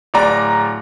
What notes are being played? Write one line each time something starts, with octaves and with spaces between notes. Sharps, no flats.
D1 D5 A#5